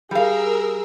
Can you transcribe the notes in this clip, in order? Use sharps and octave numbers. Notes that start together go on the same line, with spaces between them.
G3 G#4 A#4 F5 E6